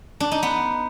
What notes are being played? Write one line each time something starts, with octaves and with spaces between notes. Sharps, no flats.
D4
D#4
B3